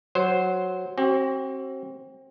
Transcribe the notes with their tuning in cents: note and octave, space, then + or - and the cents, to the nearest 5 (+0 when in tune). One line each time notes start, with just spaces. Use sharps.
F#3 +0 C5 +0
C4 +30 F#4 +40